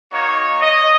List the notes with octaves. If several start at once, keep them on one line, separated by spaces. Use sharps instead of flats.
A#3 D#4 F#4 C#5
D#5